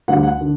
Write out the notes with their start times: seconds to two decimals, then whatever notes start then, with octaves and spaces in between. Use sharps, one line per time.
0.08 D2 D3 G3 F#5
0.23 F#5
0.41 D3